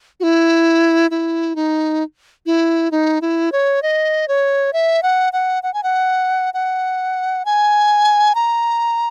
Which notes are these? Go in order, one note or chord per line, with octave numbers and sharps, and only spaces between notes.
F#4
E4
E4
D#4
E4
D#4
E4
C#5
D#5
C#5
E5
F#5
F#5
F#5
G#5
F#5
F#5
G#5
A#5